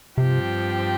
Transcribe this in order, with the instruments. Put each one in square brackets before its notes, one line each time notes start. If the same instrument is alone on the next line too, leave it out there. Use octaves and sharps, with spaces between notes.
[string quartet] G2 F3 C4 G4 [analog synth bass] C3